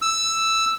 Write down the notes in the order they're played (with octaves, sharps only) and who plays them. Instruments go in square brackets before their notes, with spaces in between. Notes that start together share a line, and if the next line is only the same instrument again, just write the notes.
[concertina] E6